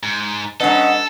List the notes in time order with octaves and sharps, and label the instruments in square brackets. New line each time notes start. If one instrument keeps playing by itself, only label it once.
[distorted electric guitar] G#2
[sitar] G3 D4 B4 [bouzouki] C#4 D#5 [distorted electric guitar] A4 [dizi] F#5